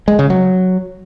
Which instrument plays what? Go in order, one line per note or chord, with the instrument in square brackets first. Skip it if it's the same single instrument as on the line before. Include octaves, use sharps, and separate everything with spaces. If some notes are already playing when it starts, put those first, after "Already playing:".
[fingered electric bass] G#3
C#3
F#3